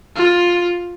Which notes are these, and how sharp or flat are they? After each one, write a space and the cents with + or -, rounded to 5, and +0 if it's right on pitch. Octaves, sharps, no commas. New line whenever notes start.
F4 +10